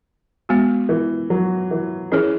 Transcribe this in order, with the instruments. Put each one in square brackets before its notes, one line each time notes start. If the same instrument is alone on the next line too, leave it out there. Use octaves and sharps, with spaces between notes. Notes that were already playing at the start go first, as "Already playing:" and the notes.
[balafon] G#3 B3 F#4
[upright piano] E3
F#3
E3
[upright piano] E3 [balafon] C#4 G#4 C#5